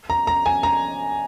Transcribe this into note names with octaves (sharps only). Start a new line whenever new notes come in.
A#5
A#5
G#5
A#5